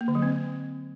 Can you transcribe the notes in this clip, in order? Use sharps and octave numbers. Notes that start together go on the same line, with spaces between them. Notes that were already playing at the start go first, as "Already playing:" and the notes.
A#3
D3
F#3
C4